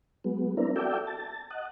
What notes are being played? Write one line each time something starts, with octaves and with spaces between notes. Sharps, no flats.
F#3 G#3 B3
B3 C4 D4 E4 A#4
F#4 A4 D5 E5 G5
A5
D#5 F#5